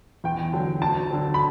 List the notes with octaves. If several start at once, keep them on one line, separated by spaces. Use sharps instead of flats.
E2 G5
D3 F#3
D2 A5
D3 F#3
B5